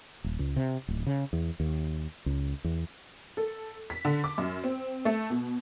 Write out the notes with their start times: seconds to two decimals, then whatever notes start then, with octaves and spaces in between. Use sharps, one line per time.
0.24 D#1
0.39 C#2
0.56 C3
0.88 D1
1.07 C#3
1.33 E2
1.60 D#2
2.26 C#2
2.64 E2
3.37 A4
3.90 B6
4.05 D3
4.24 D6
4.38 F#2
4.64 C4
5.05 A3
5.30 B2